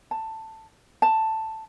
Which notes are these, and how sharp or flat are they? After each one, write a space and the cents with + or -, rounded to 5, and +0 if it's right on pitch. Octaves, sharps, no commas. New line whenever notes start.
A5 +10
A5 +5